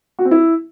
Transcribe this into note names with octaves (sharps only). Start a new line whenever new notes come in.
F#4
C4
E4